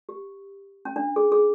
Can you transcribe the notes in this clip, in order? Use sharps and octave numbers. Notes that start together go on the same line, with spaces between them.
G4
C#4
D4
G#4
G#4